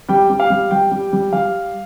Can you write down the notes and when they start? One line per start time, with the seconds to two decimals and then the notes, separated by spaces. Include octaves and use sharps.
0.09 G3 G5
0.30 G3
0.40 F5
0.50 G3
0.71 G3 G5
0.91 G3
1.12 G3
1.33 G3 F5